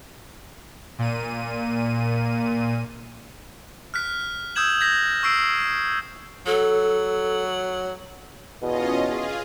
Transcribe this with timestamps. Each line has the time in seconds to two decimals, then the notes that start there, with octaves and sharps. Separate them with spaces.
0.99 A#2 D#7
3.94 F6 F#6 B6
4.56 D#6 E6 G6 G#6 E7 F#7
4.80 G6 G#6 A#6 B6
5.23 C#6 E6 C7 D7
6.47 F#3 A4
8.62 E2 B2 C#4 F4 D#5
9.05 F4 G#4